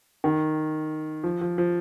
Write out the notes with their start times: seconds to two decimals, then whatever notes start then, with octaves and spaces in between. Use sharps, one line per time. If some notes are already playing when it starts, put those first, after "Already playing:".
0.24 D#3
1.24 F3
1.41 F3
1.58 F3